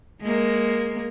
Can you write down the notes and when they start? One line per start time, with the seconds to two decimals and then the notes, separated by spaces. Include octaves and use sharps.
0.22 G#3 A#3